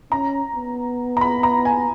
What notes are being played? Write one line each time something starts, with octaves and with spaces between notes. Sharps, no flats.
C#4 A#5
B3
A#5
B5
A#5
G#5